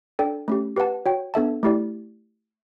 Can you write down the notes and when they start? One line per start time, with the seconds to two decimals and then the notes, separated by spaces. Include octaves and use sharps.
0.19 D4 A4 D5 G5
0.48 A3 C#4 G4
0.76 G4 B4 F#5 A5
1.06 F#4 C#5 G5
1.34 B3 D4 A4 E5 A5
1.63 A3 E4 G4 D5